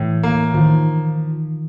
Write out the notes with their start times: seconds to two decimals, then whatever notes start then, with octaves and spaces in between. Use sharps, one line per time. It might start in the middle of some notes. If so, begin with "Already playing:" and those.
Already playing: A2 E3
0.23 A#3
0.54 D#3 F3